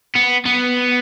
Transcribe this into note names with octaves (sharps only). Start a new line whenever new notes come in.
B3
B3